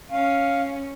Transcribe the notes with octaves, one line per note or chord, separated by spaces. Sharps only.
C#4 F5